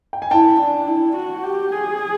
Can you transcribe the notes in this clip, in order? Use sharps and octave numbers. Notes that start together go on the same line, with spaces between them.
G5
G#5
E4 G5 A5
D4
E4
F#4
G4
G#4